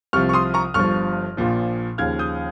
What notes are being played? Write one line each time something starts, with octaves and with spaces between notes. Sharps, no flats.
C2 C3 F3 C#6 F6
C#6
C6 D#6
A#5 C#6
G1 G2 F3 C#6 F6
A#1 A#2 F3
D#2 C#3 F3 F6 G#6
D#6 G6